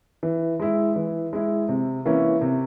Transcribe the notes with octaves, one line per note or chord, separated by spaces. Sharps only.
E3
G#3 E4
E3
G#3 E4
C3
E3 A#3 C#4 E4
C3